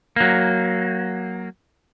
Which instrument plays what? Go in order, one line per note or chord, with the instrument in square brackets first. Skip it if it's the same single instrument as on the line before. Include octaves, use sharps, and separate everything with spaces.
[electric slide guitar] F#3 A#3